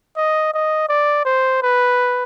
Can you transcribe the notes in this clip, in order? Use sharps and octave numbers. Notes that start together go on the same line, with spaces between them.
D#5
D#5
D5
C5
B4